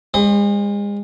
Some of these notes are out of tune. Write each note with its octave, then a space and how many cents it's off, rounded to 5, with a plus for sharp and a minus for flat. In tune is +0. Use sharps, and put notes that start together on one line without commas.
G#3 -35 C5 +30 B5 +45